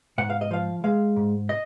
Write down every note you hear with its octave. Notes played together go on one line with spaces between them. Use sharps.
G#2 F#5
F5
D#5
F3 F5
G#3 F5
G#2
D#5